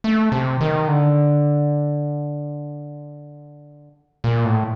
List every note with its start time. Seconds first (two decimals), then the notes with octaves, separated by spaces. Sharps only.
0.04 A3
0.32 C3
0.61 D#3
0.88 D3
4.24 A#2
4.45 A2